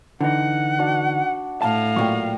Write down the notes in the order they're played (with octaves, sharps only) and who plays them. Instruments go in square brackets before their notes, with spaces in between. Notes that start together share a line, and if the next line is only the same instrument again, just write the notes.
[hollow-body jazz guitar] D3 E3 D#4 [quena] F#5
[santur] D4 F#4
[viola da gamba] A2 [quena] F5 [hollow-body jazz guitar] A5
[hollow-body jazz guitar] A#2 F#3 [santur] G5 C#6